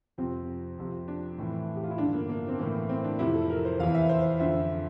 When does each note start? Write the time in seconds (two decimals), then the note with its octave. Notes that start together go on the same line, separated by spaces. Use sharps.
0.18 F2 C3 F3 C4
0.78 F2 C3 F3
1.08 D4
1.38 A2 E3
1.76 G4
1.83 F4
1.91 E4
1.98 G2 D3 F3 D4
2.14 A#3
2.29 A#3
2.48 C4
2.59 A2 E3 A#3
2.89 C4
3.04 D4
3.19 F2 C3 F3 E4
3.35 A4
3.50 A#4
3.65 C5
3.79 E2 E3 F5
3.94 E5
4.09 C5
4.39 F2 D3 F3 E5